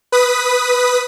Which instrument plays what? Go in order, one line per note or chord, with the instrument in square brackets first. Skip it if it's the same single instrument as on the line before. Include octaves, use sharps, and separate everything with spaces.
[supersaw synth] B4 D#6 B6